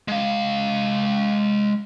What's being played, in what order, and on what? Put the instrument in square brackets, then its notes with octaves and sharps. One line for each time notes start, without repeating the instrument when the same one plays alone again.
[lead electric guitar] G#3 F5